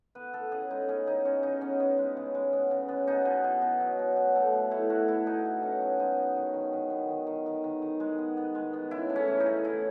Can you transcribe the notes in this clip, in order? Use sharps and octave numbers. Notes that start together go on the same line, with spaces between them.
B3 B4
B3 A4
C#3 G#4
G#3 D#4
B3 C#4
C#3 D#4
G#3 C#4
C#3 D#4
B3 C#4
B3
G#3
C#3
G#3
B3
C#3
B3
B2 D#4
B2
B2
B2
F#3
B2
B2
A3
B2
A3 E4
A3 F#4
A3 E4
B2 D#4
B2
B2 C#4
F#3
G#3 D#4
B3
D#3
D#3
D#3
B3
D#3
D#3
D#3
D#3
D#3
G#3
B3
B3
G#3
B3
C#3 E4
A3
C#4
E3
D#4
C#3
A3 E4